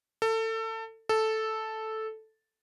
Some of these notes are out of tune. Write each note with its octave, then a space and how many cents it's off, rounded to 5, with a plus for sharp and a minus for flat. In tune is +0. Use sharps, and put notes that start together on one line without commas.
A4 +25
A4 -5